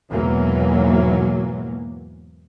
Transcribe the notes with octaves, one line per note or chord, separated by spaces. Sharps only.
E2 G#2 B2 E3 F#3 A#3